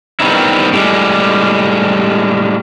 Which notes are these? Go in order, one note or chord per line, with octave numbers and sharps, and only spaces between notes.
D#3 G3 B3 C4 D#4 E4
A2 G3 G#3